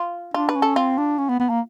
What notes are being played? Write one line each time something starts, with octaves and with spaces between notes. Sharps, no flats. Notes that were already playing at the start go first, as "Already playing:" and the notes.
Already playing: F4
D4 F4
B4
C#4
A4
C4 F4
D4
C#4
B3
B3
A#3